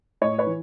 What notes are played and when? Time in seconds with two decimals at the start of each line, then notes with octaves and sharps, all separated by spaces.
0.21 A2 C#5 D#5
0.38 B4 C#5
0.47 E3